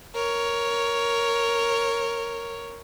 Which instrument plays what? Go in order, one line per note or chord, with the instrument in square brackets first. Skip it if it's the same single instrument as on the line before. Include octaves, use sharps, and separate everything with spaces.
[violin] A#4 C#5